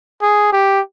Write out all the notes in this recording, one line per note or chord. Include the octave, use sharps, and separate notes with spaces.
G#4
G4